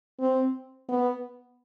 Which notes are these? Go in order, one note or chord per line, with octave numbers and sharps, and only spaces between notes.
C4
B3